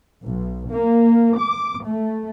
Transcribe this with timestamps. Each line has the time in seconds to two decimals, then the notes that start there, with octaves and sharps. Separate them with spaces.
0.27 B1
0.70 A#3
1.37 D6
1.84 A3